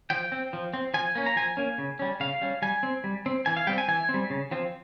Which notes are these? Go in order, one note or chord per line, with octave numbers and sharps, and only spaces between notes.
F3 G5
C4
F3
C4
F3 G#5
A#3 C#4
A#5
F3 G#5
A#3 C#4
C#3
G3 C#4
C#3 F5
G3 C#4
G3 G#5
C4
G3
C4
E3 G#5
F5
G3 C4 G5
G#5
E3 G#5
C4
G3
C#3
F3 C4